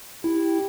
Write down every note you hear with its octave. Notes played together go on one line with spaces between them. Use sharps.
E4 G4